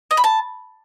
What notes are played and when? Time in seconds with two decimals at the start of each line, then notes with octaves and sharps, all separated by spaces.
0.11 D#5
0.17 B5
0.24 A5